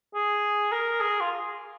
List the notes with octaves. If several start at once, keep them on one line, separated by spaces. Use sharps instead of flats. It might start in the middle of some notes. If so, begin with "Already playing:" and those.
G#4
A#4
G#4
F4